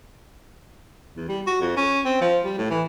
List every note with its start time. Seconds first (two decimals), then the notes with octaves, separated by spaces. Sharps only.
1.16 E2
1.29 G3
1.47 F#4
1.61 F2
1.76 C#4
2.05 C4
2.21 F3
2.44 G3
2.58 A2
2.70 E3